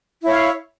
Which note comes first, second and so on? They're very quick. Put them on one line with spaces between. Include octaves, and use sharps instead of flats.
E4 C#5 F5